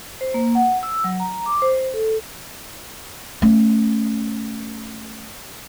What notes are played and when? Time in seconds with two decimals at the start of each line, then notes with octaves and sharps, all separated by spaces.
0.21 C5
0.34 A#3
0.55 F#5
0.83 E6
1.04 F#3
1.20 A#5
1.46 D6
1.62 C5
1.94 A4
3.42 A3 C#4